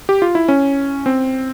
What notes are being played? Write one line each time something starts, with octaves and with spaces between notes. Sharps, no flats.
G4
F4
E4
C#4
C4